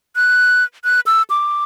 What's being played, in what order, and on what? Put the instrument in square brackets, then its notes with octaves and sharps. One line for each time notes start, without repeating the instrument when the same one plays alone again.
[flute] F#6
F#6
E6
D6